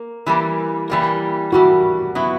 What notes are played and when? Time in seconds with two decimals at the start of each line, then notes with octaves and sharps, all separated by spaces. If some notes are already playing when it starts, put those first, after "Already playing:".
Already playing: A#3
0.26 E3 G3 A#3
0.90 E3 G3 A#3
1.52 E3 G3 A#3 F#4
2.15 F#3 B3 E4